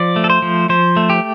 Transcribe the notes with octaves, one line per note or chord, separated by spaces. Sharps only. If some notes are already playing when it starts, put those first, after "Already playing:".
Already playing: F3 D5
A3
A4
C5
F3
F3 C5
A3
G4